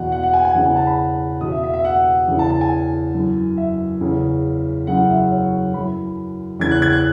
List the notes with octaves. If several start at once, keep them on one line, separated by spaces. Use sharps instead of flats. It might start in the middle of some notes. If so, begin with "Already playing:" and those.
Already playing: E2 B2 F#5
F#5
F#5
G#5
G#5
E2 C#3 E3 F#5
G#5
A5
B5
E2 B2 D#6
E5
E5
E5
F#5
E2 C#3 E3
A5
A5
G#5
F#2 E3
E5
E2 C#3 E3
F#2 C#3 E3 F#5
E5
C#5
F#2 E3 B5
E2 C#3 E3 G#6
F#6
G#6
F#6